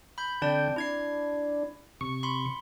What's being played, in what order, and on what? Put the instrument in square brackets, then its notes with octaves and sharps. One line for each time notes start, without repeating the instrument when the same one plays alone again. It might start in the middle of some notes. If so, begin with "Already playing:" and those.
[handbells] B5 G6
[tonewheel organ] D3 G5 [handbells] C4 D5 A5
[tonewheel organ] D4 [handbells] E4 G#6 C7
[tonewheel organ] C3 C#6
[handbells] B5 C6